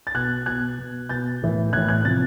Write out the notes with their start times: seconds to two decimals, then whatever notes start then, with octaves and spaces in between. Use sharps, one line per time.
0.07 A6
0.14 B2 F#6 G#6
0.46 B2 F#6 G#6
0.78 B2
1.09 B2 G6 A6
1.42 A2 E3
1.73 A2 E3 F#6 G#6
1.89 F#6 G#6
2.04 C3 F3 A6